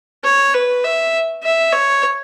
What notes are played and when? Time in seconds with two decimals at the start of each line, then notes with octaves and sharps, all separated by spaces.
0.24 C#5
0.54 B4
0.84 E5
1.43 E5
1.72 C#5